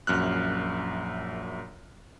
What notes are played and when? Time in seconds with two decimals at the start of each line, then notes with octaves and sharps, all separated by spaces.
0.07 A#1 F#2 F6 F#6